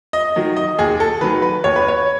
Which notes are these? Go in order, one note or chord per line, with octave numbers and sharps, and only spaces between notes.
D#5
D#3 F#3
D#5
D#2 G#4
A4
D#3 F#3 B4
B4
D#2 C#5
B4
C#5